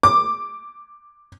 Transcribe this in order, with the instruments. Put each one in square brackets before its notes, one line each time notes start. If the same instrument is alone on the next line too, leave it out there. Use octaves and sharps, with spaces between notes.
[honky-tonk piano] D6